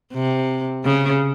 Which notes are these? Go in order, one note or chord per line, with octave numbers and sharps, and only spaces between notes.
C3
C#3